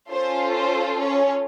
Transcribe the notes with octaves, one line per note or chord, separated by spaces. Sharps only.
C#4 F4 A4 C5
C5
C#4 C#5